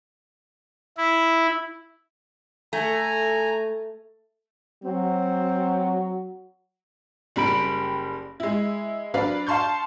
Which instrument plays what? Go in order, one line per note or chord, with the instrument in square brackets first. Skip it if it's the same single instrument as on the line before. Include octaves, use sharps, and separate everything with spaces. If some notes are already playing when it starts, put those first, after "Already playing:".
[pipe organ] E4
[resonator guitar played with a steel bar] A3 [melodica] G#5 A#5
[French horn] F#3 [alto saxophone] C4
[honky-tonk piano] F#1 G3 B5 D7
G#3 E4
F#3 D4 B4 D5 F5
F5 A5 C6 C#6 G6